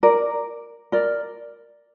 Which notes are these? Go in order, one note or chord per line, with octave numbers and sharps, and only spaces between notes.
A#4 D5
A#4 D5